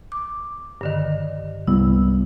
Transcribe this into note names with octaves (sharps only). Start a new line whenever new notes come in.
D6
G2 D3 D#3
C2 G3 B3 E4